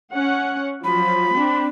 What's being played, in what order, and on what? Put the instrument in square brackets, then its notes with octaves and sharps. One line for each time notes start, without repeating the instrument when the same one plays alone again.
[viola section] C#4 F#5
[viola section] F3 F#3 [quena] B5
[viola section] C4 D4